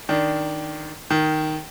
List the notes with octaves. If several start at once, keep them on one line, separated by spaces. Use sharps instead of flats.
D#3 D4
D#3